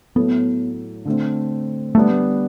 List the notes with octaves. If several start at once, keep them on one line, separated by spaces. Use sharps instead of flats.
A2 F#3 A3 B3 E4 A4
D3 A3 C4
D3 G3 A3 B3 D4